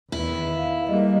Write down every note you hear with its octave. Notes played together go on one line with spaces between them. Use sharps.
E2 D#3 E4 B4
F5
G3 G#3 A#3 D#5